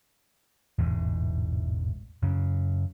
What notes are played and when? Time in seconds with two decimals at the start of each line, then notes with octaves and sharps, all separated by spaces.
0.79 E1 A1 E2 G#2
2.22 F#2 C#3